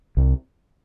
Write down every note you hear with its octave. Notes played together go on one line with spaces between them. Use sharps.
C2